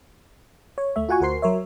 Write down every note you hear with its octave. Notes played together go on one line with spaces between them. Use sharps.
C#5
D2 A3 E5
F4 F#4 F#5 G#5 C#6
D2 F#4 A#4 C5 C6 C7
F#3 A#4 C#5 E5